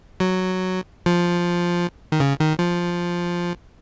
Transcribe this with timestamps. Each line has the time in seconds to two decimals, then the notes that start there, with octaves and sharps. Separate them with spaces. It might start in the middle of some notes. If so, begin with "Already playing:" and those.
0.20 F#3
1.06 F3
2.12 D#3
2.20 C#3
2.40 D#3
2.59 F3